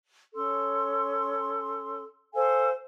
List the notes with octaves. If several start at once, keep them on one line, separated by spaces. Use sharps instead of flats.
C#4 A4 C6
A4 C5 F5 G#5